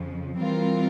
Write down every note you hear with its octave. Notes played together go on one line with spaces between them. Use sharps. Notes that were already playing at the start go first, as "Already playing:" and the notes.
Already playing: F2 C#3 F3
E3 G3 C4 F4 A#4